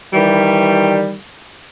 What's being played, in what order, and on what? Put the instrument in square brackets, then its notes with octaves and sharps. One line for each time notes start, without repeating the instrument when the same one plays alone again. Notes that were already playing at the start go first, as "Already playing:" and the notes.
[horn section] D#3 E3 G3